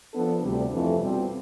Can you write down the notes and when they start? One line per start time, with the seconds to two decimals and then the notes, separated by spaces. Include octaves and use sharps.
0.12 F3 B3 D4 A4
0.42 D2 C3 G3
0.71 F2 E3 A3
1.00 B2 G3 C4